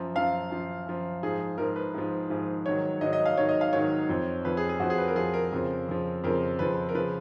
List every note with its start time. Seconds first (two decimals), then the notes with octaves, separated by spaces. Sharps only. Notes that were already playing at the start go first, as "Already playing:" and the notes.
Already playing: F#2 F3
0.15 F#2 F3 F5
0.51 F#2 F3
0.87 F#2 F3
1.23 G#2 F3 G#4
1.58 G#2 F3 A#4
1.76 B4
1.94 G#2 F3
2.30 G#2 F3
2.66 G#2 D#3 F#3 C#5
3.01 G#2 D#3 F#3 D#5
3.13 D#5
3.26 F5
3.37 G#2 D#3 F#3 C#5
3.49 D#5
3.61 F5
3.73 G#2 D#3 F#3 C#5
4.09 F2 F3
4.45 F2 F3 B4
4.57 G#4
4.69 G#4
4.80 F2 F3 F#4
4.90 G#4
4.98 B4
5.08 A#4
5.16 F2 F3 G#4
5.34 A#4
5.53 F2 C#3 F3
5.88 F2 C#3 F3
6.24 F2 C#3 F3 A#4
6.59 F2 C#3 F3 B4
6.89 A#4
6.95 C#3 F3 B4